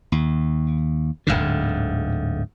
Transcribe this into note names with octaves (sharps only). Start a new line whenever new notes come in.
D#2
D1 G1 G#2 D3